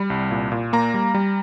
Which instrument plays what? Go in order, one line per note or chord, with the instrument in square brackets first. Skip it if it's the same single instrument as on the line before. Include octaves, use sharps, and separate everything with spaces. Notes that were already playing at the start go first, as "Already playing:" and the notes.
Already playing: [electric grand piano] G3 B5
C2
A#2
A#2
A#3 A#5
G3
G3